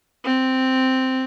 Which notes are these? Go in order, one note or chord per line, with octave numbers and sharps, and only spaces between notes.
C4